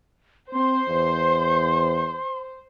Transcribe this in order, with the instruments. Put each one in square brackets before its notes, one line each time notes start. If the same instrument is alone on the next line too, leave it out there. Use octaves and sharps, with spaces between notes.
[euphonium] C4 [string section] C5 [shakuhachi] C6
[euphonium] E2